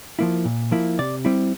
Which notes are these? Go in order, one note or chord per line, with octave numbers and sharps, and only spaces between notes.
F3 A#3 E4
A#2
F3 A#3 E4
C3 D5
G3 C4 E4